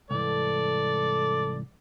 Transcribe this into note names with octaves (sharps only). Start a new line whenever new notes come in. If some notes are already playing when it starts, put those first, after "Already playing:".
C2 G#2 E3 A4 D5